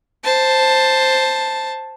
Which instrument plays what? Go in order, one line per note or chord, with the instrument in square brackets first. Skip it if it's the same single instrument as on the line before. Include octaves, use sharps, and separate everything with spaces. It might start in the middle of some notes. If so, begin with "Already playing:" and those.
[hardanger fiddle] C5 A5